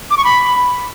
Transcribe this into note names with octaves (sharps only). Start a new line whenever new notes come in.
D6
C#6
B5